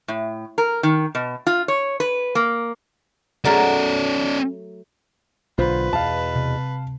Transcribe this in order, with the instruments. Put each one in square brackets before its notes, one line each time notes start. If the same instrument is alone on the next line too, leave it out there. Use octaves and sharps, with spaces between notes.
[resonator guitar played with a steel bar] A2
A#4
D#3
B2
F4
C#5
B4
A#3
[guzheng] F#3 A3 A#4 [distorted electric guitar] C#4 D5
[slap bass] B1 D3 [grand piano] F4 C5 [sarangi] B4
[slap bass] E2 B2 [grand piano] F5 A5
[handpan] C3